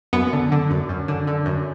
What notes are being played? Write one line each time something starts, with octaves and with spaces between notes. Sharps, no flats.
F#2 B3
D3
D3
F#2
F#2
D3
D3
F#2